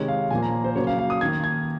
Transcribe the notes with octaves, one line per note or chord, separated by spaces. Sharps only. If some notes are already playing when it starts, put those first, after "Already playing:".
Already playing: C3 D#3 G#3 C#5
F5
A#2 F3 A#3 G#5
A#5
C5
C#3 F#3 A#3 C#5
F5
F5
D#6
D#3 A#3 G#6
G#6